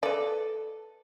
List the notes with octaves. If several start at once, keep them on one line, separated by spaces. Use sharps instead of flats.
A4 B4 D5